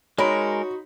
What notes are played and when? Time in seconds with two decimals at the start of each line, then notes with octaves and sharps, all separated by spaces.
0.18 G#3 D#4 F#4 A#4 C#5 B5 C6